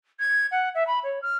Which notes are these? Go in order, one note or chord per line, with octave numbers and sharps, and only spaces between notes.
G#6
F#5
E5
B5
C#5
F6